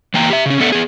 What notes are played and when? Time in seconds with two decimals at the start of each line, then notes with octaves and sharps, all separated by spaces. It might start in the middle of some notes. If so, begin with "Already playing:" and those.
0.14 E3 A#3 G5 A#5
0.30 G4 E5
0.46 C#3 C#4
0.60 B3 D4 A4 E5 F#5
0.72 B3 G#4